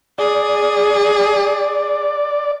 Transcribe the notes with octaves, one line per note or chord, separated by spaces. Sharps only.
G#4 D5